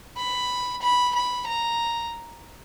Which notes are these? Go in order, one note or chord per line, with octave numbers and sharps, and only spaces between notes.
B5
B5
B5
A#5